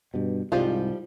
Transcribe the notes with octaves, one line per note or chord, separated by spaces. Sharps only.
G2 B2
C2 G#2 F3 G3 F4